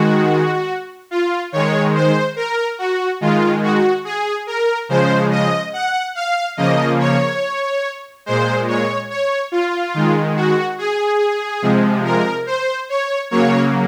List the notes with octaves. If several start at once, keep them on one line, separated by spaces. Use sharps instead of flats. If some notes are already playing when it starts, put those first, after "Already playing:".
Already playing: D#3 G#3 F#4
F4
D#3 G#3 C#5
C5
A#4
F#4
D#3 G#3 F4
F#4
G#4
A#4
C#3 F3 G#3 C5
D#5
F#5
F5
C#3 F3 A#3 D#5
C#5
A#2 G#3 C5
C#5
C#5
F4
D#3 G#3
F#4
G#4
C3 F3 G#3
A#4
C5
C#5
C#3 F#3 A#3 C#5